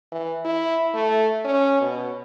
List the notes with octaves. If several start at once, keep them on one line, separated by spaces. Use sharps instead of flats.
E3
E4
A3
C#4
B2